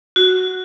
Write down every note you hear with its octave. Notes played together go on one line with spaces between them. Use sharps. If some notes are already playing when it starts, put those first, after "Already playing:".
F#4